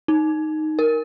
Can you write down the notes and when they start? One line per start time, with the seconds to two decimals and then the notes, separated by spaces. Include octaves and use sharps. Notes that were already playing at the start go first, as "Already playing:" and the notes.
0.08 D#4
0.79 A#4